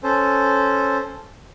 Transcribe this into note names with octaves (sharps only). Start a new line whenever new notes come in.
C#4 A4 C5